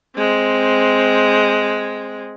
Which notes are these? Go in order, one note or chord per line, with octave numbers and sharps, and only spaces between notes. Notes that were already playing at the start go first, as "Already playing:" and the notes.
G#3 C4